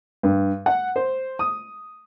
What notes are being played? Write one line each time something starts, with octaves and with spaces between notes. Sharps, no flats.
G2
F#5
C5
D#6